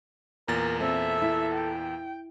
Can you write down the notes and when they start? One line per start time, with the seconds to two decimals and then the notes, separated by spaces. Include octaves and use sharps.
0.48 E2 A#2 A#4 A6
0.80 C4 A4 E5
1.22 E4
1.54 G5